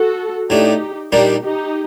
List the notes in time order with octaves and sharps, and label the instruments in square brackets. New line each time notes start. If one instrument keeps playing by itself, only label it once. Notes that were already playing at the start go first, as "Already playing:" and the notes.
Already playing: [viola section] F#4 A4
[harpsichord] A2 A3 D4 [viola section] D#4 G4
[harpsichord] A#2 G3 A#3 D4 [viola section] D#4 G4
[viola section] D#4 G4